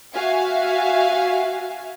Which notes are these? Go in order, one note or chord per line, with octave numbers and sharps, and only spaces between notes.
F#4 E5 F5 G#5